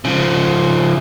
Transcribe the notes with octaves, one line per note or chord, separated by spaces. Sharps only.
C#3 F3